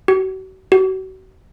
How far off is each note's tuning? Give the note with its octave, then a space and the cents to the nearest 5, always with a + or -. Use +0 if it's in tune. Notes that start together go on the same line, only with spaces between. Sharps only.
F#4 +40
F#4 +35